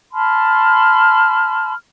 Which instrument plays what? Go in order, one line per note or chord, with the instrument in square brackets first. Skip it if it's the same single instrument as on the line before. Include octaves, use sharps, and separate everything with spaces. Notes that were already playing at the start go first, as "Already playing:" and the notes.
[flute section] A5 B5 C6 F6